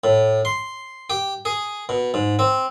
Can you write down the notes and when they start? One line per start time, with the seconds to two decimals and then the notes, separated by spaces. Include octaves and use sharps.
0.04 A2
0.45 C6
1.10 G4
1.45 G#4
1.89 B2
2.14 G#2
2.39 C4